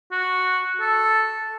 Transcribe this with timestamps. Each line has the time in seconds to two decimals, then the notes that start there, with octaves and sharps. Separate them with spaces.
0.11 F#4
0.80 A4